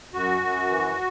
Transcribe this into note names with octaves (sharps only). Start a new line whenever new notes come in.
F#2 F#4
F#2
E3